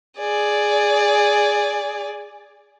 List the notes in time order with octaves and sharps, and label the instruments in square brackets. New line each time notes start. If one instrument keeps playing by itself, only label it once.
[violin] G#4 D5